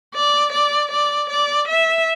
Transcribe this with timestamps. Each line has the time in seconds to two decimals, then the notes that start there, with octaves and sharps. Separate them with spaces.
0.15 D5
0.53 D5
0.91 D5
1.30 D5
1.69 E5